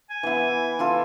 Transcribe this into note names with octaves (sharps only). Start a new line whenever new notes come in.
G#5
E3 B3 E4
E3 F4 A4